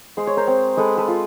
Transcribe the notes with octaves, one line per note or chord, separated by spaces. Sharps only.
G#3 C5
C#5
A#4 C5
C4
G#3 A4 B4
A4 B4
F4